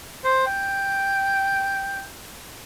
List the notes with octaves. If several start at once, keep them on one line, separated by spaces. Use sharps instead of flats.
C5
G5